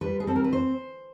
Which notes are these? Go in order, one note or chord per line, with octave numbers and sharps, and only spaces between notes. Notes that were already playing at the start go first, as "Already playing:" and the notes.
G3 B4
G#4
C4 A4
A#4
B4
C5